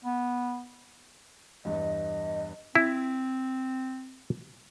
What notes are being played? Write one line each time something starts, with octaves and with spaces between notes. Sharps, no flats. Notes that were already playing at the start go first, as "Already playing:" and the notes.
B3
E2 G2 D#5
C4 E4